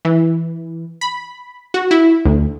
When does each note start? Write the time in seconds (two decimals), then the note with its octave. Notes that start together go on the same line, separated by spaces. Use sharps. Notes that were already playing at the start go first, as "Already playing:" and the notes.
0.05 E3
1.01 B5
1.74 F#4
1.91 E4
2.25 D2